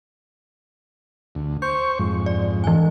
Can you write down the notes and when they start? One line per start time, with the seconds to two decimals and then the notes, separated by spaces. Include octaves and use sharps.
1.35 D2
1.62 C5 C#6 G6
1.99 F2 G#2
2.26 D5
2.64 E3 G#5